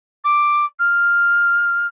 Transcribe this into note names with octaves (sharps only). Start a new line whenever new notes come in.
D6
F6